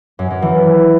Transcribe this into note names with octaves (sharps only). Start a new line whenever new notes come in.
F#2
F#2
E3